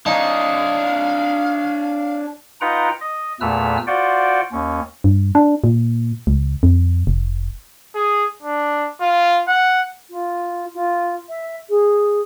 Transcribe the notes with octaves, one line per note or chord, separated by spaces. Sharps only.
D4 D#4 C#5 F5
D#4 F4 B4 F#5 G5 A#5
D#5
E2 A#2 A3 B4 E6 F6
F4 F#4 C5 D5 F#5 G5
D#2 C#4
G2
D4
A#2
C#2
F2
F1
G#4
D4
F4
F#5
F4
F4
E5
G#4